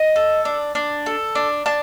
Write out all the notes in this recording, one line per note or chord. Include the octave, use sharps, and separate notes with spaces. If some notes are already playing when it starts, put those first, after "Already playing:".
Already playing: D#5
A4
D4
D4
A4
D4
D4 A5